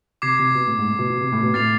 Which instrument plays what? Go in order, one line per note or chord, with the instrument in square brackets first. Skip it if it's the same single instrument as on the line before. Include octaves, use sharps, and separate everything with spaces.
[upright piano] C3 [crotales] D6 G#6 C7
[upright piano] C3
B2
A2
G#2
A2
B2
B2
C3
A2
B2
[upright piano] A2 [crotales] F6 A6 C7 F7